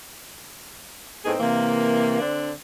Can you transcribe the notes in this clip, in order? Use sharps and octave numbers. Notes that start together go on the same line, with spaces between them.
A2 B3 C4 D#4 G#4
C3 E3 A#3
D3 C4 D4